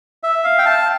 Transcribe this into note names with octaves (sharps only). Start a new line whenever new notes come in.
E5
F5
G5
A5